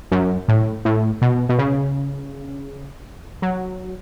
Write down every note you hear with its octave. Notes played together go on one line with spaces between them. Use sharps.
F#2
A2
A2
B2
B2
C#3
F#3